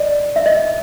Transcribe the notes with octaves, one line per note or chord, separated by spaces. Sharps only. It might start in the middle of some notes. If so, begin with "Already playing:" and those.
Already playing: D5 D#5
E5
D#5